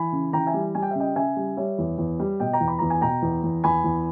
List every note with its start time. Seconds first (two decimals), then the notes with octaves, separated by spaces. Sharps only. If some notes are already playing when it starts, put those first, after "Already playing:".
Already playing: E3 G#5 B5
0.13 C#3
0.33 E3 G5 A#5
0.47 E5 G#5
0.54 G3
0.75 G3 G#5
0.82 G5
0.91 E5
0.95 C#3 D#5 G5
1.16 C#3 E5 G#5
1.36 G3
1.57 G3 C#5 E5
1.78 E2
1.98 E2
2.19 G3
2.40 B2 D#5 G5
2.53 G5 A#5
2.60 E2
2.68 B5
2.79 E2 A#5
2.90 G#5
3.01 B2 G5 A#5
3.22 E2
3.43 E2
3.64 E2 G#5 B5
3.84 E2